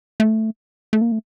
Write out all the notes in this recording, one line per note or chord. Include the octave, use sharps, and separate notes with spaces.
A3
A3
A#3
A3